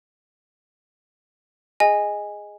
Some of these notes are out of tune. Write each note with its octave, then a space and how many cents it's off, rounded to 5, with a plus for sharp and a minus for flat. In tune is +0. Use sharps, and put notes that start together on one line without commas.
G#4 +0 D#5 +0 G#5 -10